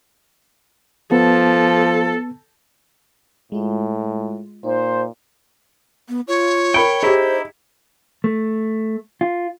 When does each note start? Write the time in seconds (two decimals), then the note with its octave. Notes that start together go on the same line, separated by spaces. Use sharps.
1.12 F3 B3 A4
3.52 A2 G#3 F4
4.64 A#2 D#4 C5
6.09 B3
6.28 F4 C#5
6.74 A#4 G5 B5 C#7
7.03 D#4 E4 G4 G#4 C5
8.24 A3
9.21 F4